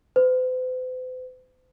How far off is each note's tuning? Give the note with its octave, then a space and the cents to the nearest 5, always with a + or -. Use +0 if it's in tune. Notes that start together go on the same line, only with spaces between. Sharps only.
C5 -45